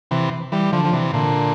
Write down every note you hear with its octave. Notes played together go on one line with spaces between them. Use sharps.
C3 E3
E3 G3
D3 F3
F3
C3 E3
A#2 D3